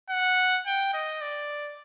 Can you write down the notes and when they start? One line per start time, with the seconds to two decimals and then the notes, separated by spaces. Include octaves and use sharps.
0.10 F#5
0.66 G5
0.94 D#5
1.22 D5